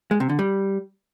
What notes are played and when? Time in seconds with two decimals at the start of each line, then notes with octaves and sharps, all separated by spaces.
0.11 G#3
0.20 C3
0.29 D3
0.39 G3